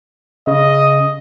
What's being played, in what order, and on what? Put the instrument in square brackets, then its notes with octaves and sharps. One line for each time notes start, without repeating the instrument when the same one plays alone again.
[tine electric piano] C#3 [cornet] D#5